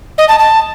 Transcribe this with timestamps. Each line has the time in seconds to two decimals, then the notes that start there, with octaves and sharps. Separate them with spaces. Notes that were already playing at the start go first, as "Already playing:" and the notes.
0.18 D#5
0.28 A5
0.39 A5